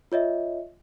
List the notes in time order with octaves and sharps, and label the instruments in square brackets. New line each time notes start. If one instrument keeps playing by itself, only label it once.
[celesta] F4 C#5 D#5 E5